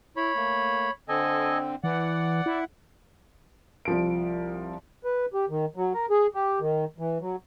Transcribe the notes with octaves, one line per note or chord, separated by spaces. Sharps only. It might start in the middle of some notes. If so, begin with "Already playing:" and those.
E4 C#5 B5
A3 A#3
D3 C4 A4 D#5 G#5
E3 D5 F#5
E4
C2 F3 D7
B4
G4
D#3
F#3
A#4
G#4
G4
D#3
E3
F#3